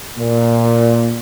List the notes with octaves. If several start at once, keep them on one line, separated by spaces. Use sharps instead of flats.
A#2